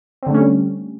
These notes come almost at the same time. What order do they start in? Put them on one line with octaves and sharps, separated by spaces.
C4 D3 A3 C#4 G3